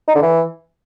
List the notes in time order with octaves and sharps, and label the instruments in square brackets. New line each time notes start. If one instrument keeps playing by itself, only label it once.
[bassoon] D#4
D3
E3